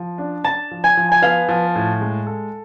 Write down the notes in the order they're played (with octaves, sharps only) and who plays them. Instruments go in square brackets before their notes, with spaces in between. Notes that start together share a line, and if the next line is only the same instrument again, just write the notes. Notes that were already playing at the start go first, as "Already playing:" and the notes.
Already playing: [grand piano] F3
D4
[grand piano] D4 [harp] A5
[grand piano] F3
[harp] G#5
[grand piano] F3
[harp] G#5
[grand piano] B3 [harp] F5
[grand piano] F3
A2
G#3
A4